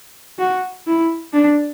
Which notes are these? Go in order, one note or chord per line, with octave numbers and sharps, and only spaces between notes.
F#4
E4
D4